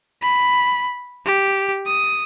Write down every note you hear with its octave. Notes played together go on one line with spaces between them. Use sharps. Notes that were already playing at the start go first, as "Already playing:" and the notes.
B5
G4
D#6